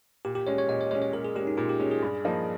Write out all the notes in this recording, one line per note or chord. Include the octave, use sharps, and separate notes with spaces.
A#2 G4
G4
G#3 C#4 C#5
C#5
A#2 D#5
C#5
G#3 C#4 C#5
C#5
A#2 A#4
G#4
G#3 C#4 G4
D#4
A#2 F4
G4
G#3 C#4 G#4
G#4
G2
F3 A#3 D#4